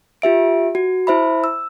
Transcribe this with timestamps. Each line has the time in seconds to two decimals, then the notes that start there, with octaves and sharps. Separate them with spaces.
0.22 F4 G4 E5 D7
0.75 F#4
1.07 E4 C5 E5 B5
1.44 E6